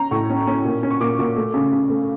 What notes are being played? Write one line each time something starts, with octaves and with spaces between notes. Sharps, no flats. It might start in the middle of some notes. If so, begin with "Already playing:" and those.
Already playing: C#4 A#5
A2 C#6
C#4
C#4
A#2
C#4
C#6
A#2 D6
A#2
A3
C#3
C#3
A3